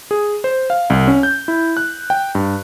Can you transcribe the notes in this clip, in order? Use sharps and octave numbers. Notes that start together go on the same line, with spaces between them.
G#4
C5
F5
C2
C#4
G6
E4
F#6
G5
G2